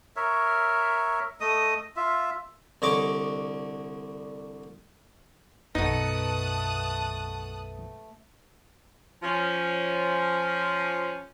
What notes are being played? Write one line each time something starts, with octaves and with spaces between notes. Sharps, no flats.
A#4 C#5 E5
A3 D#5 D#6
F4 E5
C2 D3 C#5 D#5 C#6 D6
B1 F#2 A3 B3 D#4 A5 D#6 F#6
F3 C#4